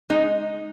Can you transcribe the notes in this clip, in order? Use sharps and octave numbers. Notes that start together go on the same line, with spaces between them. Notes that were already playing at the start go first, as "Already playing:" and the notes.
G#3 D#4